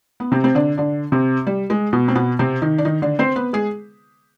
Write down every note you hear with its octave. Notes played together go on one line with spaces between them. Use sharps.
B3
C3 C4
C4
D3 D4
D3 D4
C3 C4
G3
G#3
B2 B3
C4
B2 B3
C3 C4
D#3 D#4
D4
D#3 D#4
D3 D4
C4 C5
B3 B4
G#3 G#4